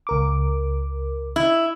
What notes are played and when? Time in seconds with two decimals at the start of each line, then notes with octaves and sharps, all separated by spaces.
0.07 C#2 A#4 D6
1.36 E4